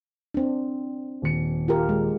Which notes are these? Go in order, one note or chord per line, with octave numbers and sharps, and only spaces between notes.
C4 D4
D#1 C#7
F4 G4 A#4
G#3